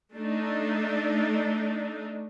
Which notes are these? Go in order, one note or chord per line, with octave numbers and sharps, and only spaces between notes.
A3 D4 D#4